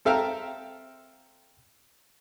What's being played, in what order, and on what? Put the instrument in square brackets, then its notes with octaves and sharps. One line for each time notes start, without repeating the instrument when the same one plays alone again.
[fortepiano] C4 A4 E5 F5 G5 A#5